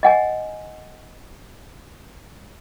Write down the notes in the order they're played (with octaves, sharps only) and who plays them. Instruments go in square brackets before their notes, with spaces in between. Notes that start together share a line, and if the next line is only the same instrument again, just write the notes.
[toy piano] D#5 F#5 G#5